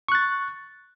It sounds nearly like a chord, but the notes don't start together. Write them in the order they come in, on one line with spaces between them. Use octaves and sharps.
C#6 F#6 A6